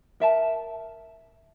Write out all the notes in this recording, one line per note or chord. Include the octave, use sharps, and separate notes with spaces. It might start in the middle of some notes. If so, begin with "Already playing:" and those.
A#4 E5 A5